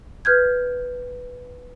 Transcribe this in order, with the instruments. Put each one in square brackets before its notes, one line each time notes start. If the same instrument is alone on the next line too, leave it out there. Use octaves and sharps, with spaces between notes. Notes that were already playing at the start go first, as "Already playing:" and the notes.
[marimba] B4 F6 G6 G#6